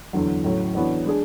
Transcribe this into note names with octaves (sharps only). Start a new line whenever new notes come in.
E2 D3 F#3
A2 F#3 C#4
E3 B3 D4 F#4 C#5
G#3 D4 G#4